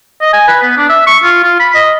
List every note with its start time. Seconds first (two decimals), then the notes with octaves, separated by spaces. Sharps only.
0.21 D#5
0.33 G#5
0.48 B4
0.62 B3
0.77 D4
0.89 E5
1.07 C#6
1.24 F4
1.43 F4
1.60 B5
1.75 D#5